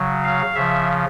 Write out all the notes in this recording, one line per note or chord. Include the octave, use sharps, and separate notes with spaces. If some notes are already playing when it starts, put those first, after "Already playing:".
Already playing: C#3 F#3
F5
C#3 F3 E5